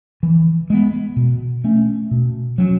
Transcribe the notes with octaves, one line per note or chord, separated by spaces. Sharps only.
E3
G#3 B3
B2
A3 C#4
B2
F#3 C#4